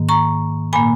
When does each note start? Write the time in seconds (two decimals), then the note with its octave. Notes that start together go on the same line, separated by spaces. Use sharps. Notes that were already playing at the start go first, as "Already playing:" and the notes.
Already playing: G#2 D#3 A#3
0.09 A#5 C#6
0.73 A#2 A#3 G#5 B5